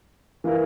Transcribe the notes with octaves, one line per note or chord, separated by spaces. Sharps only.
E3 A#3 E4 A#4